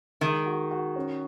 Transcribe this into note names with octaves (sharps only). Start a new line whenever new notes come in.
D#3 G#3
F#4
F#4
C#4